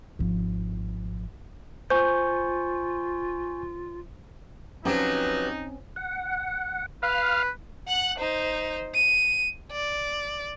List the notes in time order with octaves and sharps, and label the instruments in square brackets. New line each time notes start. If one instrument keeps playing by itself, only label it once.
[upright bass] G#1 F3
[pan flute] F4 [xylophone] C5 [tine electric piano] G#5 C#6 G6
[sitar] F3 F#3 G4 [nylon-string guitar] C4 C#4 [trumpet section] D#4 [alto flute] B4
[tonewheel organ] F#5
[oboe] B4 [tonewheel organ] F5 F6
[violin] F#5 F#6
D#4 C5
D#7
D5